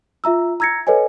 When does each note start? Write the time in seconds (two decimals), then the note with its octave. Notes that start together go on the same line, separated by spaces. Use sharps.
0.24 F4 E5 A#5 E6
0.60 A#5 E6 G#6 A#6 C#7
0.87 A4 B4 C#5 D#5 G#5